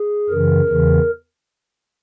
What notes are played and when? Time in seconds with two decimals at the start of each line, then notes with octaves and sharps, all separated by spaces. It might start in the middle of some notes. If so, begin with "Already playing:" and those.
Already playing: G#4
0.30 F#2 C#3 E3 A#4
0.68 E2 C#3 E3